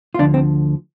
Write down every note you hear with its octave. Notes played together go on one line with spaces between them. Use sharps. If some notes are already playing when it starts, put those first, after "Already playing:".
F4
D2 D3 F3 D4
C4